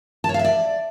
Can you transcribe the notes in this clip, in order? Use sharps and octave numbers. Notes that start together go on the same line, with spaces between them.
A5
C#5
F5
E5
D5